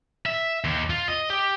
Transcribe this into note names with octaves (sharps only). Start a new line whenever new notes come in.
E5
D#2
F4
D#5
G4